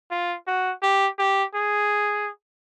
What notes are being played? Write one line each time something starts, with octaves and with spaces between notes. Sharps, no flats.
F4
F#4
G4
G4
G#4